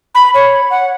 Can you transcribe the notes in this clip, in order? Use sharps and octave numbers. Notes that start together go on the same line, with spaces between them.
B5
C#5
F#5